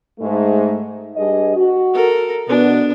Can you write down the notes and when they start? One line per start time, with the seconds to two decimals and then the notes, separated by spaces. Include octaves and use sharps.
0.20 G#2 A3
1.16 G2 G#4 D#5
1.56 F#4
1.94 A4 A#4
2.48 B2 B3 D4